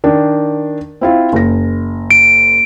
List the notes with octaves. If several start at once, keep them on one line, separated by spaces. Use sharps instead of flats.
D#3 D4
C4 E4 F4
F#1 A#6
D7